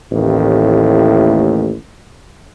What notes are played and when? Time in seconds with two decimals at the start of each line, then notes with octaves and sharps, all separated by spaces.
0.12 A1 D#2 A2